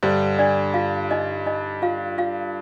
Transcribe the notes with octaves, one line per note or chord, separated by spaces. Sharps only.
G2 D3 G3 C5
D4 D5
F4 F5
D#4 D#5
D#4 D#5
F4 F5
F4 F5